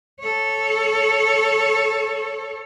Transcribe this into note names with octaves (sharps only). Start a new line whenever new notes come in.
A4 C#5